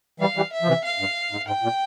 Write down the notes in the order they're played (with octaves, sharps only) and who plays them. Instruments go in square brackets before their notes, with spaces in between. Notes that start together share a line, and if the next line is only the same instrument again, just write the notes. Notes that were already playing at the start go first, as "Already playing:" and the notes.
[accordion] E3 G3 [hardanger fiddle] F5
[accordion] E3 G3
[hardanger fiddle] E5
[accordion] F3
C3 E3
[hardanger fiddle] F5
[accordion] G2
G#2
[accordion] G#2 [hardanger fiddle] G5
[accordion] A#2